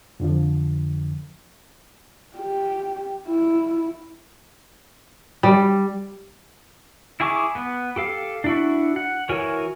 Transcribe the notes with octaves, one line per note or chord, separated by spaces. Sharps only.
F2 D3 F3
G4
E4
G3
E4 G#4 G#5 C#6 D6
B3
G4 A4 F5
D4 E4 F#4
F#5
E3 F#4 A#4 C#5 G#5